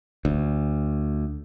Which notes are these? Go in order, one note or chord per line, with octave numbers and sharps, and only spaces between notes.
D2